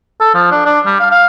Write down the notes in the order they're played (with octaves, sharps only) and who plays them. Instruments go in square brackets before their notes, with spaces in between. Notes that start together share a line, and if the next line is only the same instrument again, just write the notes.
[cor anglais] A4
F3
D4
D4
G3
F5
F5